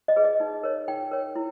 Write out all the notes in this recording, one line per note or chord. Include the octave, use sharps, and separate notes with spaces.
D#5
G#4 B4
D#5
D#4
A#4 C#5
D#4 G5
A#4 C#5
E4